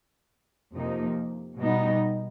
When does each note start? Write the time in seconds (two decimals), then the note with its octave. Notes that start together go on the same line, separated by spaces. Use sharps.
0.74 F2 C3 F3 A#3 D#4
1.59 B2 G3 B3 D#4